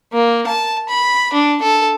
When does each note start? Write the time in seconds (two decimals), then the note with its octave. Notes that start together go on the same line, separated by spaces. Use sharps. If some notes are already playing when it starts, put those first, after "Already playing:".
0.13 A#3
0.47 A5
0.89 B5
1.33 D4
1.62 A4